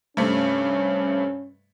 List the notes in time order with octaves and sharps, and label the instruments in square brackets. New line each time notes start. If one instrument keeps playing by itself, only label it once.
[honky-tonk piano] G2 C3 A3 [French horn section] C#4